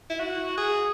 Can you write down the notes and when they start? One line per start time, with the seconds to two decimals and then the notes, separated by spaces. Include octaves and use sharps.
0.10 E4
0.19 F#4
0.57 G#4